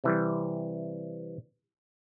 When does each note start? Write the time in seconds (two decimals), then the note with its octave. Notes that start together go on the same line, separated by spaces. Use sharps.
0.04 C3 E3 G3